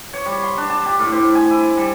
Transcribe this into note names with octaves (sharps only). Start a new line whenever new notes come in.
C#5
G3
C6
D4
A5
G4
A2
C5
G#5
E4
G3